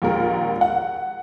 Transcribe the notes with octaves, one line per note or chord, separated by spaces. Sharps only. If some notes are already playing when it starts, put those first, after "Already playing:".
A#1 D#2 G#3 A#4
F#5